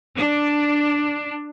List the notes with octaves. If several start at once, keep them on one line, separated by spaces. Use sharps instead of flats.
D4